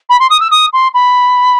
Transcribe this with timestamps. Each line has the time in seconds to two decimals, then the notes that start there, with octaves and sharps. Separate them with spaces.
0.09 B5
0.19 C6
0.30 D#6
0.40 E6
0.51 D#6
0.73 C6
0.94 B5